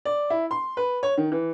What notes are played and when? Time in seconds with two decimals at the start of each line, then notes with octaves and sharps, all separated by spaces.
0.05 D5
0.30 E4
0.51 C6
0.77 B4
1.03 C#5
1.18 D#3
1.32 E3